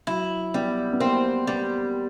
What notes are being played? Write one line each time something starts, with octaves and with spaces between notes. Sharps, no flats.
F#3 E4
G3 B3
B3
A#3 C4
G3 B3